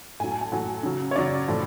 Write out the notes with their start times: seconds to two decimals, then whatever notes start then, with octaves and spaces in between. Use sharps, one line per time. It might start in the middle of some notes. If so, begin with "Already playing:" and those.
0.20 A2 F#3 G#5
0.31 A5
0.41 G#5
0.52 A2 F#3 F#5
0.83 C#3 F#3
1.11 C#5
1.15 C#3 F#3 D5
1.48 A2 F3